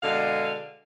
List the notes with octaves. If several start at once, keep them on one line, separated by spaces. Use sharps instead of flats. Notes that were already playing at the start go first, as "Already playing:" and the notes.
B2 D3 G#3 F5